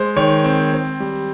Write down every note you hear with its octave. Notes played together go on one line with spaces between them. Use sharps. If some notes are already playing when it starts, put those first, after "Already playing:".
Already playing: G#3 C5
D#3 C#5
C4
C4
G3